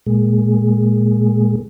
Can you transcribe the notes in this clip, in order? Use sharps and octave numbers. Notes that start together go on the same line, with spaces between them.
A#2 G#3